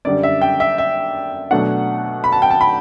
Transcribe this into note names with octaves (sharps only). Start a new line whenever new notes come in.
F#2 D3 G3 D5
E5
G5
E5
E5
B2 F#3 A3 D4 F#5
B5
A5
G5
A5
B5